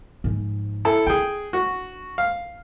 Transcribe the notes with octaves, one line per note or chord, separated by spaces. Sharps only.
G#2 F3
E4 A4
D4 G#4 G5
F#4
F5